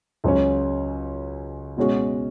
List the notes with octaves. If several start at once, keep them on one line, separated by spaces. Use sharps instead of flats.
C#2 C#3 F#3 C#4
B2 G#3 C#4 F#4